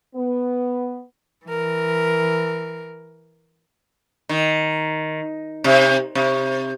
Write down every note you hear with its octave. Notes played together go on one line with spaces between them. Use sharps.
B3
E3 A#4
D#3
C3
C3